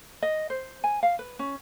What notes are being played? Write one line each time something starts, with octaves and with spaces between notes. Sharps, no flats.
D#5
C5
G#5
F5
B4
C#4